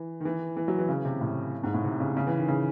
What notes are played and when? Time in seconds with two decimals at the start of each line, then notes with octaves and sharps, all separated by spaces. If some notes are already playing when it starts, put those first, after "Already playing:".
Already playing: E3
0.20 D#3
0.25 E3
0.57 E3
0.68 F#3
0.78 E3
0.88 C#3
1.05 C3
1.21 A2
1.63 G#2
1.74 A2
1.84 C3
2.00 C#3
2.17 C#3
2.27 E3
2.38 D#3
2.48 C#3